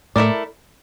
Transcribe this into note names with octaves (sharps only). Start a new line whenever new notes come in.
A2 A3 E4 A#4 D5